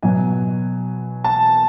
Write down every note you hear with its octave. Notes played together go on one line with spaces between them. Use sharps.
B2 F#3 G#5
A5